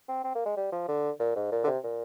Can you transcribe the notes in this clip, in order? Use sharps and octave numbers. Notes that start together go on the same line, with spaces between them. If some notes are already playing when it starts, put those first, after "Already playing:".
C4
C4
A#3
G#3
G3
F3
D3
A#2
G#2
A#2
D3
C3
A#2